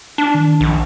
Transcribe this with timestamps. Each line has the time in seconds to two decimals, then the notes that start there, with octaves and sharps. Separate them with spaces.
0.18 D4 A5
0.34 D#3
0.61 A#1